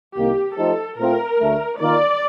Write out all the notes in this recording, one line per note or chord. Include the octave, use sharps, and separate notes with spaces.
C2 C3 D#3 A#3 G4
F3 A3 D#4 G4 A4 C5
A#2 A3 C4 F4 A#4
D2 D3 A3
D#3 A#3 F4 A#4 D5